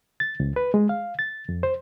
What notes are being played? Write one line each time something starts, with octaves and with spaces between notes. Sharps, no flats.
A6
C#2
B4
G#3
F5
A6
F2
C5